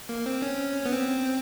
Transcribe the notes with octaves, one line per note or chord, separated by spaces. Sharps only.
A#3
C4
C#4
B3
C4